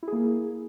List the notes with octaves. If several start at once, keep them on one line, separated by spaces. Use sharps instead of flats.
A#3 E4 G#4